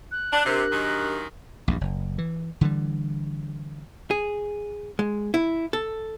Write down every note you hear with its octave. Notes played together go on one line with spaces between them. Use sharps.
F#6
D4
C3 D4 G4 A#4
F#2 D#3
A#1 E2 G2
F#1
E3
D3 E3 G3
G#4
G#3
E4
A4